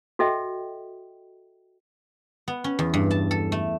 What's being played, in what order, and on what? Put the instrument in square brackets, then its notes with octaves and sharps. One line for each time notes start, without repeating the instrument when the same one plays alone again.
[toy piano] F#4 A4 D#5 E5 G5
[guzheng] B3
C#4
E2
G2
A5
A4
A3